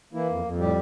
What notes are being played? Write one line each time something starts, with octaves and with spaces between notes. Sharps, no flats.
E3 A#3 E4
F2
F2
A2 G3 G4